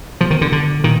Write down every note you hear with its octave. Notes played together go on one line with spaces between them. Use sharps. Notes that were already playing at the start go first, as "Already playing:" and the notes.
B2 F3
D#3
D3
D3
A#2 D#3